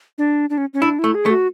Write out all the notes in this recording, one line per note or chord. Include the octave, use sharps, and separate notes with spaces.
D4
D4
C#4
C#4
D4 E4
A3 E4
G#4
A3
F#4